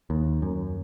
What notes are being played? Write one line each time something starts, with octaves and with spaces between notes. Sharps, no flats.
D#2
F#2